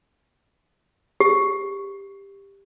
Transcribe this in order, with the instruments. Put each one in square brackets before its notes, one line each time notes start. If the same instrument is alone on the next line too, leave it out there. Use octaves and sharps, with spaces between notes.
[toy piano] G4